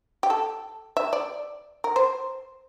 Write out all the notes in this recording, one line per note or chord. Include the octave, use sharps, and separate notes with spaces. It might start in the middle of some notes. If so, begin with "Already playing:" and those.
G4
A4
E5
D5
A#4
C5